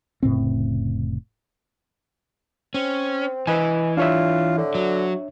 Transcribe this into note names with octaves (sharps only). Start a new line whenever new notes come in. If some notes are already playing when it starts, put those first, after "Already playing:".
F1 A2 C#3 C4
C4 C#4
E3 B4 D#5 G#5
D4 F4 C#5 E5
D3
F#3